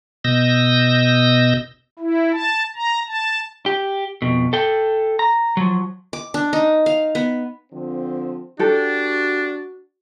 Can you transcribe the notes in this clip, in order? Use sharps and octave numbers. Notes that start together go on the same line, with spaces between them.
B2 D#5 E6 G6 A#6
E4
A5
A#5
A5
G4
F2 B2
A4 G5
A#5
F3 F#3
D6
D4
D#4
F5
B3
D3 F3 C4
D4 F#4 G4 A4